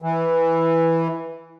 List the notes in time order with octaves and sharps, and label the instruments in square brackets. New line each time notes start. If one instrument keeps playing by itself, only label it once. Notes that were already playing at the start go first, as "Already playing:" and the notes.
[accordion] E3